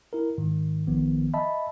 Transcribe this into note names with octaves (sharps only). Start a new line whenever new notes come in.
E4 A#4
G#2 D#3
A#1 D#3 F3 B3
D#5 E5 A5 B5